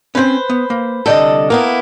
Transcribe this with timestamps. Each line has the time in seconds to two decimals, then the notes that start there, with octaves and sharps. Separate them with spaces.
0.15 C4 C#4 B4 C5
0.50 B3
0.70 A#3
1.06 C2 D3 A4 D5 D#5 G5
1.50 A#3 B3 E4 A#4